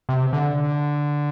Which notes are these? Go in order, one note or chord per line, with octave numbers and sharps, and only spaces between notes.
C3
D3